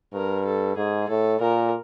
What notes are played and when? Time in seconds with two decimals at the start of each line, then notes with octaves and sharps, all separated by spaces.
0.14 G2 A#4
0.45 A4
0.77 G#2 G#4
1.08 A2 A4
1.41 A#2 A#4